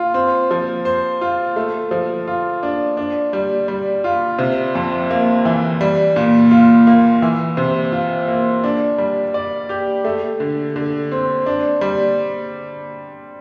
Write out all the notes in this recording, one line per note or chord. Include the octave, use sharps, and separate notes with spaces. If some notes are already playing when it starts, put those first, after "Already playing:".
Already playing: F4
C4
F3
C5
F4
A3
F3
F4
D4
D4
G3
G3
F4
C3
F2
A#3
E3
G3
A#2
F4
A#3
E3
C3
F4
A#3
D4
G3
D5
G4
A3
D3
D3
C4
D4
G3